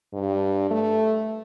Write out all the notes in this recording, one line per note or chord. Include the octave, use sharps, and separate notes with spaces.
G2
A3